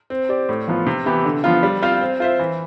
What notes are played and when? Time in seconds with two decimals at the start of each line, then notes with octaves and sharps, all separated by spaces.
0.10 C4
0.29 G4 D5
0.49 A2
0.68 F3 B3 F4
0.87 C3
1.06 E3 B3 E4 G4
1.25 D3
1.44 F3 B3 F4
1.63 G3
1.82 C4 F4 C5 F5
2.01 C4
2.20 F4 C5 E5
2.39 E3